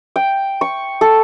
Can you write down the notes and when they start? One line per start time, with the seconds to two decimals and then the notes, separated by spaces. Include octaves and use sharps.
0.16 G5
0.61 C#6
1.01 A4